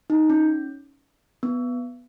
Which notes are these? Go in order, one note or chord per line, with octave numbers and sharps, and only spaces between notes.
D#4
C#4
B3